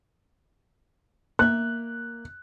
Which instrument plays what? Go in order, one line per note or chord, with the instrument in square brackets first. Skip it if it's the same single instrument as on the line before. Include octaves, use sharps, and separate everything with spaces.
[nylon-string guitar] A#3 E5 [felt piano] F#6